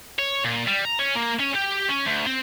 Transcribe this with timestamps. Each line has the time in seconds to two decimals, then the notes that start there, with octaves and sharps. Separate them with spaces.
0.19 C#5
0.44 A#2
0.68 G3
0.85 A#5
0.99 C#4
1.15 A#3
1.39 C#4
1.55 G4
1.89 C#4
2.06 D2
2.27 C4